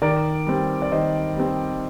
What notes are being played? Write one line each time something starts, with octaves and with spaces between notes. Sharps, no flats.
D#3 A#4 D5
G3 C4
D5
D#3 C5 D#5
G3 C4